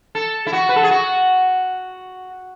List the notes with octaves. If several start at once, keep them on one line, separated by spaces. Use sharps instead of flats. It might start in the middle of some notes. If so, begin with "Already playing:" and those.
A4
E4
F#4
B4
A4
G#4
F#4